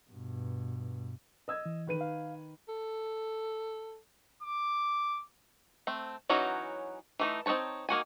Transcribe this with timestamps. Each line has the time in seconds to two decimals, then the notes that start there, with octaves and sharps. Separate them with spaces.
0.10 G2 B2
1.48 D#5 E6 G#6
1.66 E3
1.87 D#3 B4 D#7
2.01 F5
2.69 A4
4.43 D6
5.87 A3 C4
6.29 E3 F#3 C#4 D#4 F#4
7.19 E3 A3 D#4
7.46 C4 D#4 B4 C#5 A5
7.89 D#3 A#3 F#4 G#5